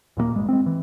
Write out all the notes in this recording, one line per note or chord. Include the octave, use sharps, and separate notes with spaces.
D#2 A#2 G3 A#3
G#1 G2 G#3
G#3 C4
E3